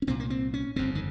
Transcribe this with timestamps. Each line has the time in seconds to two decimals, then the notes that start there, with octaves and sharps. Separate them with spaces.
0.02 C#4
0.07 C2 A#2 C4
0.20 A#3
0.30 C4
0.54 C#4
0.76 G1 F2 C#3 C4
0.95 D#3